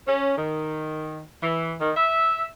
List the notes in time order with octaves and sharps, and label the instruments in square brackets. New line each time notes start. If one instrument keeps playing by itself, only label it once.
[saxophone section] C#4
D#3
E3
D#3
E5